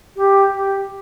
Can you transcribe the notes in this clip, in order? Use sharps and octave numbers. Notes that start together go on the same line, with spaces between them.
G4
G4